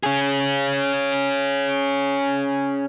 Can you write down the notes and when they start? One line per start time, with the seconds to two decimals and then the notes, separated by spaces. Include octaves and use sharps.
0.04 C#4 G#4